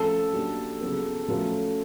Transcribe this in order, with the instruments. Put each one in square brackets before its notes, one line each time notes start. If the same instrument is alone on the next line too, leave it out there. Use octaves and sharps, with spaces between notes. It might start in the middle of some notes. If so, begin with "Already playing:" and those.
Already playing: [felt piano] F3 A3 C#4 [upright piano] A4
[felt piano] F#3 A#3 D4 G4
C#3 F#3 B3
F3 A3 C#4 F#4 A#4